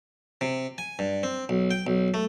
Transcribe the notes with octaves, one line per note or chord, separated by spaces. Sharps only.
C3
G#5
G2
C4
B1
G5
B1
A3